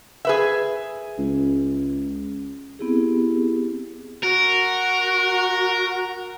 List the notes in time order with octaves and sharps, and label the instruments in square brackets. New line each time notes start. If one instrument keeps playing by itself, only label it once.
[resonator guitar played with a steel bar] G#4 B4 E5
[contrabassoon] C#2
[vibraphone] B3 C4 E4 G4 G#4
[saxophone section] F#4 [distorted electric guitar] A#4